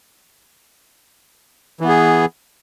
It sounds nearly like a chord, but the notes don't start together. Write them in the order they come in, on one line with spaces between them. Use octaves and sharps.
E3 B3 G#4